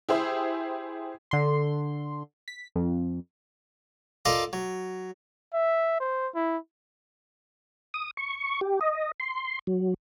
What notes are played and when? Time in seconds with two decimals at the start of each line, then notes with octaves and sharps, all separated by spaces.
0.09 E4 G4 G#4 C5 E5
1.31 D3 C6
2.48 B6
2.76 F2
4.25 F4 A4 A#4 D5 D#5 F5
4.53 F#3
5.54 E5
6.00 C5
6.35 E4
7.94 D#6
8.17 C#6
8.61 G4
8.81 D#5
9.20 C6
9.67 F#3